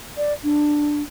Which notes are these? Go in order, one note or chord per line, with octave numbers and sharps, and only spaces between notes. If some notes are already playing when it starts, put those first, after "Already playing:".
D5
D4